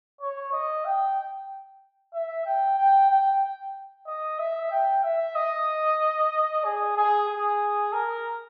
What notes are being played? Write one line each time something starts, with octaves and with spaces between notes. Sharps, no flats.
C#5
D#5
G5
E5
G5
G5
G5
D#5
E5
G5
E5
D#5
G#4
G#4
G#4
A#4